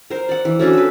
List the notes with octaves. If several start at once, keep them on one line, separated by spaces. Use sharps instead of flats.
A#4 C5
D5 F#5
E3
A3 C#4 D4 F#4
A4 B4